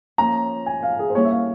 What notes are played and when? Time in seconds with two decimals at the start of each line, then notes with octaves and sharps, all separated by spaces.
0.18 F3 A#3 C#4 A#5
0.66 G#5
0.83 F5
0.99 G#4
1.10 C5
1.15 G3 A#3 C#4 E4 C#5
1.25 E5
1.31 F5